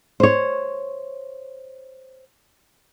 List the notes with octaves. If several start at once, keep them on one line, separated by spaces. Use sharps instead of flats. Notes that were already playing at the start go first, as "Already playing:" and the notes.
C5 C#5